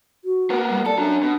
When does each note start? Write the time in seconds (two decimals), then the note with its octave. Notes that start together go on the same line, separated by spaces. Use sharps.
0.25 F#4
0.50 A#3 B3
0.70 G3
0.86 A4 D5
0.98 F#3 C#4 D4
1.23 B2